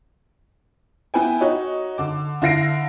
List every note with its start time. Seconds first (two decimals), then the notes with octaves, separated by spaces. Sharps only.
1.14 B3 E4 B4 G5 G#5
1.40 D#4 F#4 C#5 D#5
1.98 D3 D6
2.42 D3 E4 F5 A#6 C7 D7